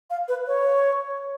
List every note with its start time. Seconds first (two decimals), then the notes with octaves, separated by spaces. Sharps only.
0.10 F5
0.28 B4
0.47 C#5